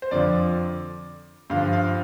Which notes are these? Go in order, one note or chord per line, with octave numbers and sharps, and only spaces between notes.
C5
F2 D3 F3 D5
G2 D3 F3 F5
F5